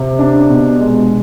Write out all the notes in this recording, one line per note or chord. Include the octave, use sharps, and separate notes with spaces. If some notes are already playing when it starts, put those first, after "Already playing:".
Already playing: C3
D4
B2
G#3